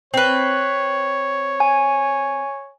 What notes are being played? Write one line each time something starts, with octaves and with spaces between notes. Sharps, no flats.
C4 B4 C#5
G#5